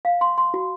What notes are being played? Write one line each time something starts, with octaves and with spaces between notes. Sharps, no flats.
F5
C6
C6
F#4